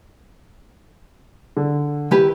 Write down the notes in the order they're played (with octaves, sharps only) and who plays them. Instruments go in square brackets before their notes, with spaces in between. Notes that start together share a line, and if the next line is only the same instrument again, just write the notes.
[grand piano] D3
[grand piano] D#3 [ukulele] E4 G4 B4